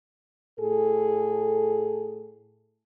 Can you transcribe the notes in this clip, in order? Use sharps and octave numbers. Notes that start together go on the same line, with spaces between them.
A2 G#4 A4